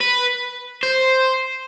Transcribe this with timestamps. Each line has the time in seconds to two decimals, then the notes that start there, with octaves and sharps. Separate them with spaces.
0.01 B4
0.83 C5